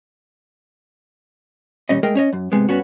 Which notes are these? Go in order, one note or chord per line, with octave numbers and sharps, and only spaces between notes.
D#2 A#2 G3 C#4 D#5
G#3 A3 G#4 A#4 D#5 G5
C#4 C#5 D#5
F#2
G#2 C3 G#3 B3
G2 B3 C#4 F#4